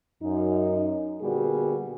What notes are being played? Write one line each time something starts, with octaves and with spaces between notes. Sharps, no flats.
F#2 D#4
A#2 D3 G3 B3 F#4 G#4